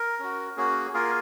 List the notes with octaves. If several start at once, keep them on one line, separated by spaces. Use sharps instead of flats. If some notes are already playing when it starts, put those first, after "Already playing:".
Already playing: A#4
C#4 F#4
A#3 C#4 F#4 G#4
A#3 F4 G#4 A#4